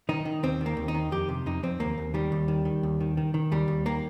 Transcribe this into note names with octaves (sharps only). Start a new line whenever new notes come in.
D#3 D#4
D#3
D#2 C4
D#3
A#3
D#2
D#4
D#3
F2 G4
C3
F2 D#4
F2 C4
D#2 A#3
D#2
D#3 G3
D#2
D#3
D#3
D#2
D#3
D#3
D#3
D#2 G3
D#2
D#3 A#3